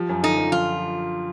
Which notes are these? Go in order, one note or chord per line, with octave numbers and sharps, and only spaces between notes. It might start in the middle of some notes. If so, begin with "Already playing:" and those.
Already playing: F3 G4
F#2
D3 D#4
F3
F3 F4